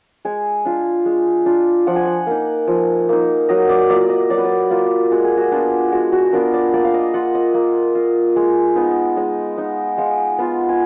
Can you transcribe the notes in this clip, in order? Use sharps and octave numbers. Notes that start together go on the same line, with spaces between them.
G#3 G#5
D4 F4
G#3
D4 F4
F3 F#5
G#5
F#5
A#3 D#4
F3
A#3 D#4
F#3 D#5
D5
A#3 F4 D5
D#5
F#3 D5
B4
D5
A#3 F4
G#3 F#4
G#4
F#4
B3 D4 F4 F#4
G#3 F#4
F#4
B3 D4 F4 A#4
D5
A#3 D5
F5
D#5
F4 F#5
D#5
A#3
F4
G#3
B3 D#4
G#3 D#5
B3 D#4
G#3 F5
B3 F4
G#5